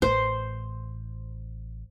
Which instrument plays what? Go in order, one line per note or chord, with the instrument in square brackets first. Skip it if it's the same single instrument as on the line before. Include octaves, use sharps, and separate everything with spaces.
[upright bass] A1 [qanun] C5